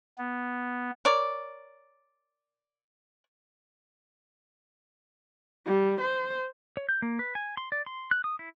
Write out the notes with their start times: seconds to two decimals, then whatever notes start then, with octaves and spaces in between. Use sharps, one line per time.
0.18 B3
1.05 A#4 C#5 D5
5.66 G3
6.01 C5
6.77 C#5
6.89 G6
7.02 A#3
7.19 B4
7.35 G#5
7.57 C6
7.72 D5
7.86 C6
8.11 F#6
8.24 D#6
8.39 E4